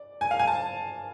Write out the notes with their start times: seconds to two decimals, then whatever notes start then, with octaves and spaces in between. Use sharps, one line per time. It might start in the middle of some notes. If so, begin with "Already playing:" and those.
Already playing: D5
0.21 G#5
0.31 F5
0.39 G#5
0.47 A5